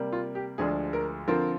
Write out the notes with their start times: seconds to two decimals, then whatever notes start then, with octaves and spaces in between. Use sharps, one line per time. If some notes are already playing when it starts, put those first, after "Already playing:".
Already playing: C3 G3 A#3
0.12 F4
0.35 G4
0.58 D2 D3 F3 G#3 D4 G#4
0.93 A#4
1.28 D3 F3 C4 F4 A#4